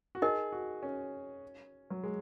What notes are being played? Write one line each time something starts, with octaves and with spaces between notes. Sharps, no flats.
F#4
D#4 G#4 A#4 D#5
F#4
C#4
F#3
G#3